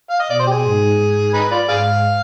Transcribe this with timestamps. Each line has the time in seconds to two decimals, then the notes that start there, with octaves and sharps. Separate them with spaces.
0.10 F5
0.20 D#5
0.28 B2 D5
0.39 C5
0.47 G4
0.51 G#4
0.63 G#2
0.98 G#2
1.34 D#4 G#4 B4
1.51 F4 B4 D5
1.69 G#2 G#4 D5 F5